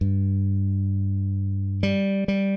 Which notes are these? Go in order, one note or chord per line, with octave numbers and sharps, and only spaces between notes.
G2
G3
G3